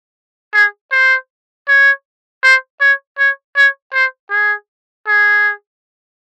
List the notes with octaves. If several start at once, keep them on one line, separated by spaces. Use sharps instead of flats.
G#4
C5
C#5
C5
C#5
C#5
C#5
C5
G#4
G#4